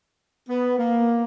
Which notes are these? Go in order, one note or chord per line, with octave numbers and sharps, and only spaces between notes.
B3
A#3